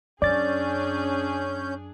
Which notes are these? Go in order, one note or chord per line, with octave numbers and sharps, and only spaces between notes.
F#2 C#4 D4 G#4 D5 G6 A6